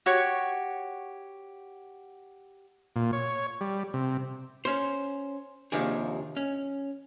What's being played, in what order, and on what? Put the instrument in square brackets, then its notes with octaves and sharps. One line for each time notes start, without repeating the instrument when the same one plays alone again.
[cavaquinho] F#4 G4 C#5 C#6
[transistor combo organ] A#2
C#5
G3
C3
[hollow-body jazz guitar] C#4 C5
D#2 G#2 C3 F3 D4 G#4
C#4